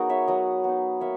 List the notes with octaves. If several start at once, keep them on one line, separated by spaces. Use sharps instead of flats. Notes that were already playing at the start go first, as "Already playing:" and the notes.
Already playing: F#3 B3 D#4 F#4 G#4 A#4
C#5 E5
F#3 B4 D#5
B3 D#4
A#3 C#5 E5